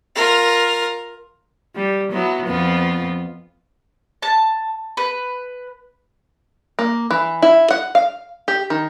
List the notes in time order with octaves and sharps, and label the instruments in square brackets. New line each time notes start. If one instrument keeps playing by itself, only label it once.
[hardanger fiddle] F4 A#4
[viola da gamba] G3
F#3 B3 E4
F2 B3 F4
[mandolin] A5
B4
[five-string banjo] A#3
E3
E4
F#5
F5
G4
D#3